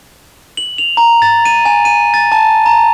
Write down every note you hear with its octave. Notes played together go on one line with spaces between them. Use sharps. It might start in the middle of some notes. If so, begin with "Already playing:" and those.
F#7
F7
A#5
A6
D#7
G#5
D#7
A6
A5
A#5